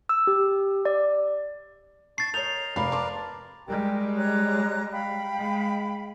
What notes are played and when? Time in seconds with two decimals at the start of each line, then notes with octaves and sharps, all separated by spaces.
0.09 E6
0.27 G4
0.85 D5
2.18 A5 C#6 A6 C7
2.34 A#4 C#5 D#5 G6 F7
2.76 F1 A#4 B4 D5 F5 B5
2.92 A5 C6 D6
3.68 G3 G#3 G4 A#4 G5
4.17 C#5 A#5 F#6
4.93 F5 G5 B5
5.39 G#3